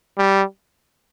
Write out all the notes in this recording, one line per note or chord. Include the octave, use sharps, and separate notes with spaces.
G3